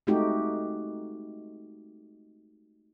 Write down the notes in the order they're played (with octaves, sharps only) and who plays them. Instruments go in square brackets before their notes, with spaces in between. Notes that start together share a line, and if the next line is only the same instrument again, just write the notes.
[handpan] G#3 A3 C4 D#4 F#4 G4